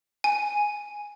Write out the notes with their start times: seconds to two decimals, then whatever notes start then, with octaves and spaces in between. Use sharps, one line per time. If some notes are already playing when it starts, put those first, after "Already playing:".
0.24 G#5